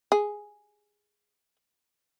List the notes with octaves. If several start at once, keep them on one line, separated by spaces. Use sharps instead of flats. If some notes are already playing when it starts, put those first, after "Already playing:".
G#4